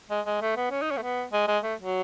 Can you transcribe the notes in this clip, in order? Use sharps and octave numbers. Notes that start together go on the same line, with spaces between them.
G#3
G#3
A3
B3
C#4
D#4
C#4
A3
B3
G#3
G#3
A3
F#3